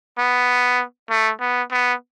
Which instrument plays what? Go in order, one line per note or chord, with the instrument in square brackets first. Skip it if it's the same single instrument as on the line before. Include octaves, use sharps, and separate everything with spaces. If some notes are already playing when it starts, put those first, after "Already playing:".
[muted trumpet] B3
A3
B3
B3